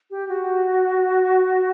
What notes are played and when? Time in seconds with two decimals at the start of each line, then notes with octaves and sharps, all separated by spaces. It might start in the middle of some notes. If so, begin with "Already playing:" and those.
0.11 G4
0.29 F#4